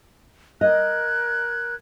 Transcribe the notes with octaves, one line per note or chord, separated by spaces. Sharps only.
A#4 D#5 F#6 G#6